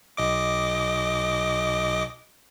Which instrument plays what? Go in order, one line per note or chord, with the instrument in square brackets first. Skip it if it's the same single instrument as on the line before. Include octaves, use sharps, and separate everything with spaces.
[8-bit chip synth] B1 D#5 D6